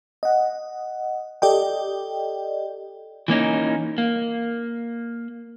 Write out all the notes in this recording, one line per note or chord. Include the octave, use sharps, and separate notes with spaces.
D#5 F#5
G4 A4 D5 D#5 G5
E3 A#3 C#4 D#4
A#3